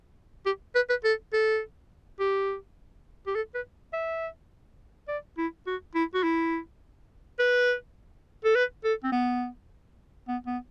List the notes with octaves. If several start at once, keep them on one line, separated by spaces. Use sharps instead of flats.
G4
B4
B4
A4
A4
G4
G4
A4
B4
E5
D5
E4
F#4
E4
F#4
E4
B4
A4
B4
A4
C4
B3
B3
B3